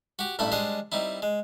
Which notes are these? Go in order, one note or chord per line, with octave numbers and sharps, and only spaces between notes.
F#4 G4
A1 G2 A3 E4 B5
G3 G#3 D4 C5 D#5
G3 C4 D#4 E4
G#3